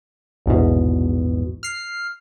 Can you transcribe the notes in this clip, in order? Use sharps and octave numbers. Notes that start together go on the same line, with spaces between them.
A#1 E2 G#2 B2
F6 C7